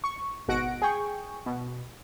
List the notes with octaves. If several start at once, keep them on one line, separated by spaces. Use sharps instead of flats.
C#6
G#1 B2 F#4 F#5 A#6 D7
G#4 G5 C#6
B2